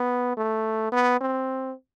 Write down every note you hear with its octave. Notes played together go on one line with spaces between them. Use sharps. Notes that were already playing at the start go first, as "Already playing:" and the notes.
Already playing: B3
A3
B3
C4